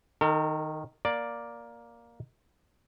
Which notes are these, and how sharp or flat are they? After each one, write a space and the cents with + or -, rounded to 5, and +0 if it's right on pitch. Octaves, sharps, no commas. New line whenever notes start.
D#3 +0 A#4 -45
A#3 +10 D5 +0